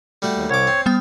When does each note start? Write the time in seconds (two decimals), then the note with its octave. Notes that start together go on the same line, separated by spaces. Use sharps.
0.22 G3 A3 F#4
0.36 D#2
0.50 C2 C#5 D6
0.67 C4
0.86 G3 B3 G5